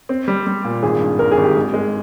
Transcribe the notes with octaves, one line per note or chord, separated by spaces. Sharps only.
C4
G3
G3
A#2
G#1 G#4
G2
G#1 A#4
G#4
G#1
G4
G#3
G#3